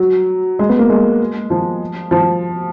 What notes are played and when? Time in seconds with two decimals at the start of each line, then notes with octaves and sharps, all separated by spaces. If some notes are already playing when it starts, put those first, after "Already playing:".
Already playing: F#3
0.59 G#3
0.69 B3
0.79 A#3
0.90 G#3
1.50 F3
2.11 F3